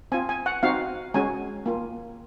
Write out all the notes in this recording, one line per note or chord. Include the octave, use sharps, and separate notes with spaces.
C4 F4 G#5
G#5
F#5
C4 D#4 F#4 F5
G#3 C#4 F#4 G#5
A#3 F4